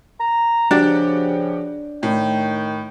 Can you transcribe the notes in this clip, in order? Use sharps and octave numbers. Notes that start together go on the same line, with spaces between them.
A#5
C#3 F3 D4 F#4 G4
A2 D#3 G5